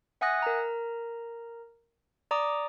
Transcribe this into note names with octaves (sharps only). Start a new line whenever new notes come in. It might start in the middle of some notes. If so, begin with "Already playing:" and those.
E5 F#5 G#5 D#6 F#6 A#6
A#4 A#5
D5 A#5 D6 D#6